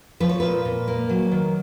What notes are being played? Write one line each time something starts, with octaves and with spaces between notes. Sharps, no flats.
F3 B4
C#5
A#2 B4
A#2
A#3
F#3
D#3